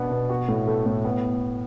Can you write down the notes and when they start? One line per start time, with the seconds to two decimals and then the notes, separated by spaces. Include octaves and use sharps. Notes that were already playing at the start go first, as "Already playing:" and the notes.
Already playing: B2 B3 D4
0.11 B2
0.29 F#4
0.48 A2
0.68 A3
0.86 A2
1.05 B3